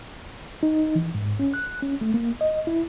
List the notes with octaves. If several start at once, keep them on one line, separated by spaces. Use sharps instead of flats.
D#4
E3
G#2
C#4
F#6
C#4
A3
A#3
D#5
E4